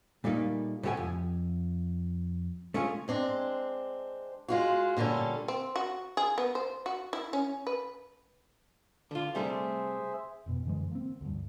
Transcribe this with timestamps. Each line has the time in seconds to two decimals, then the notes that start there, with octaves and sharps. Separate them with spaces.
0.24 A#2 G3 A3 A#3 D#4
0.83 A2 C3 A3 G4 F#5 G#5
0.97 F2
2.74 A3 C#4 F4 G#4
3.08 G#3 C4 D4
4.48 G#3 F4 F#4
4.97 A#2 D3 G3 C#4 A4
5.48 C4
5.76 F#4
6.17 G#4
6.38 B3
6.55 C5
6.86 F#4
7.13 E4
7.33 C#4
7.67 B4
9.11 D3 F4
9.35 C3 G3 A3 G#4 C5 E5
10.46 F1 B2
10.65 F#2 D3 E3 G#3
10.92 A#3 C4
11.21 D2 G2